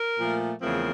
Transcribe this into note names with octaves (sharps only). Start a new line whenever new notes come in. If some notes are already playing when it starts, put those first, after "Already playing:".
Already playing: A#4
A#2 F3 A3
E2 C#3 F3 A3 C4 A#4